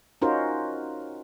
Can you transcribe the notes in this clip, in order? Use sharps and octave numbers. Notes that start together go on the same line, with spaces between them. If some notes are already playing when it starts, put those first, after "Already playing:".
C#4 D#4 F4 F#4 A#4 C5